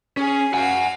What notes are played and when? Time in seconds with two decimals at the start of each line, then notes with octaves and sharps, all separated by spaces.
0.17 C#4 G#4
0.54 F#4 F5 F#5 G#5